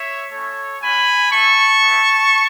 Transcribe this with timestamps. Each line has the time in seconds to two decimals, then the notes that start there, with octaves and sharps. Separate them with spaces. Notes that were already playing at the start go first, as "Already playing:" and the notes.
Already playing: C#5 E5
0.31 A3 C#4 E4 A4 C#5
0.81 G#3 C#4 F#4 G#5 B5
1.31 A3 E4 A5 C#6
1.82 B3 E4